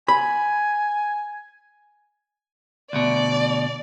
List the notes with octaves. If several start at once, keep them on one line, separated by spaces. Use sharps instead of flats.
G#5 B5
D2 B2 D5